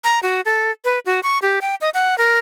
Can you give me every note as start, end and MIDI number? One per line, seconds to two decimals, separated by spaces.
0.04 0.19 82
0.23 0.41 66
0.45 0.71 69
0.85 0.99 71
1.06 1.20 66
1.23 1.38 85
1.42 1.59 67
1.61 1.75 79
1.81 1.90 75
1.94 2.17 78
2.18 2.39 70